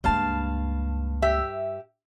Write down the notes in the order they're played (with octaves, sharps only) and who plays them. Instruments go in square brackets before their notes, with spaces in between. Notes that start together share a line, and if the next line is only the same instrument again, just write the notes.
[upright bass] C#2 A#3 [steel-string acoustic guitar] G2 F5 A5
[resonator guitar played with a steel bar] G4 E5